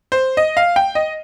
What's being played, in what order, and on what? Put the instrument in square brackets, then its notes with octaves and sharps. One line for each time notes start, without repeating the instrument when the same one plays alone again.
[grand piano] C5
D#5
F5
G5
D#5